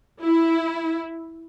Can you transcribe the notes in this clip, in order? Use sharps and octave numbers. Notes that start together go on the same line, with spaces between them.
E4